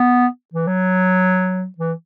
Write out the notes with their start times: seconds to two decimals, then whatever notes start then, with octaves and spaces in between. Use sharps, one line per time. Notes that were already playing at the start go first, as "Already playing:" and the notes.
Already playing: B3
0.54 E3
0.67 F#3
1.78 E3